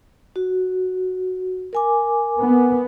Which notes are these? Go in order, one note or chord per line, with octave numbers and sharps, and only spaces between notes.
F#4
A#4 G#5 D6
B3